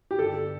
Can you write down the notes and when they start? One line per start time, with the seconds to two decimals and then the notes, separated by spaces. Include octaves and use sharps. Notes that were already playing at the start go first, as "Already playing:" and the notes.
0.11 G4
0.19 G1 A4